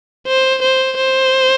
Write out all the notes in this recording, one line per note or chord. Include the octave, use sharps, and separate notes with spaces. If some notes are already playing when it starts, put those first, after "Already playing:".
C5
C5
C5